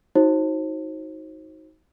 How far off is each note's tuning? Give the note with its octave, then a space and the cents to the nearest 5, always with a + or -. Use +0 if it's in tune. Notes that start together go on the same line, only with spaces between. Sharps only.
D#4 +30 F#4 +0 C5 +35